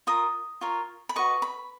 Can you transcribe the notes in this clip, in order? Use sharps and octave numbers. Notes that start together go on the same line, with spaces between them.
F4 A#4 D#6
F4 A#4 C#5
B5
F#4 B4 D#5 C#6
B5